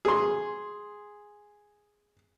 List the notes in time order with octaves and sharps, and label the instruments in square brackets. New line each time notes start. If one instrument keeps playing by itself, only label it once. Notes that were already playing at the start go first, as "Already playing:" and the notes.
[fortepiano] G#4 C6